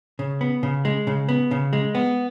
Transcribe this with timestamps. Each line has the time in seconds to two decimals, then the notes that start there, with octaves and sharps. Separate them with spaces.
0.19 C#3
0.41 B3
0.63 C#3
0.85 G#3
1.07 C#3
1.29 B3
1.51 C#3
1.73 G#3
1.95 B3